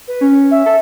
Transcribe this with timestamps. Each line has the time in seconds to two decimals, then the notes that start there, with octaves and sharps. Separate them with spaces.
0.08 B4
0.21 C#4
0.51 E5
0.66 A4